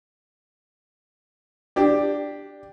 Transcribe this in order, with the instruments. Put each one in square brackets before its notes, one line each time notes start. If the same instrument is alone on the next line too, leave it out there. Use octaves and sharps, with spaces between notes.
[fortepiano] D4 G4